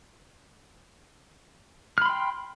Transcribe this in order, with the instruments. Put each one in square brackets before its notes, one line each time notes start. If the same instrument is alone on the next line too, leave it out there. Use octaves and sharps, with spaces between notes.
[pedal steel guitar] F6
B5
C6
G5